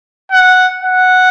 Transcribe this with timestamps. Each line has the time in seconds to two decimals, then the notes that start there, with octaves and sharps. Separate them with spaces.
0.32 F#5
0.82 F#5